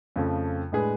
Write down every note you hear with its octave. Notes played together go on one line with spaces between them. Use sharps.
F2 C#3 F3 A3
A2 G#3 D4 G#4 B4